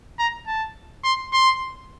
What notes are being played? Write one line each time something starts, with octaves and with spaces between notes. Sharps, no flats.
A#5
A5
C6
C6